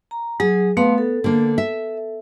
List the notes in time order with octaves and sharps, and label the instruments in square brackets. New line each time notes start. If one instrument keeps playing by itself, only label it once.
[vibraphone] A#5
[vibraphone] F#3 [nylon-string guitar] G#4
[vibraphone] A3 F5 C6 [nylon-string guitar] B3
[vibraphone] A4
[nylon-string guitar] D3 A#3
E5